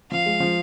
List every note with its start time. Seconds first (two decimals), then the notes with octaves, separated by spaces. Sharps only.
0.11 F3 F5
0.26 G#3
0.40 F3